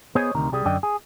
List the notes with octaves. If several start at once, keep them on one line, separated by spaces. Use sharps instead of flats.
B3 G#4 C5 C#5 D#5 G#5
D2 C3 D#3 A#5
C2 G3 G#4
F#2 D3 D5 D#5 G5
G#4